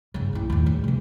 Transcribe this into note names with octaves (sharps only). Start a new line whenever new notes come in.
G1 C#3
A#1 E4
D#2 A2
D4
C3 E3